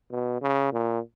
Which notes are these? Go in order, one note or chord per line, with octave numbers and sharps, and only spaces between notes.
B2
C#3
A#2